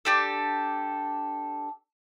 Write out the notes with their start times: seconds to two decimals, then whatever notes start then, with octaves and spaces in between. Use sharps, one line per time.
0.05 D4 G4 A4